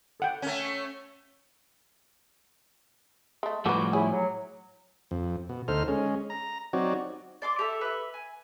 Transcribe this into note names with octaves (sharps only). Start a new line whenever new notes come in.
A4 F#5 G5
A3 C#4
G#3 A3
A2 F3 G3 F#4 A4 B4 D6
F#3 A3 E4 G#4
F#3
F2
B2
D2 D#4 A4 C5 F6
G#3 C#4
A#5
F#3 C4 D#4 F#4 C#5 D5
D5 C6 D6
G4 A4 E5
B4 E5
G#5